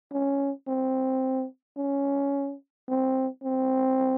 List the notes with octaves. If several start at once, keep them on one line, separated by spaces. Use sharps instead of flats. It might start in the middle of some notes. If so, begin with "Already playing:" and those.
C#4
C4
C#4
C4
C4